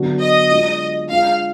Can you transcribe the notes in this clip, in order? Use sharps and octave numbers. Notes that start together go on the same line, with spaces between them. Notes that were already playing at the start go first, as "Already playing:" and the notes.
Already playing: D3 F#3 B3 D4 F#4
D#5
G#3 D4 F4
G#3 D4 F4 G#4 F5